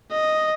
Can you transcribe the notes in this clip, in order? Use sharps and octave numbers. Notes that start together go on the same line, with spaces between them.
D#5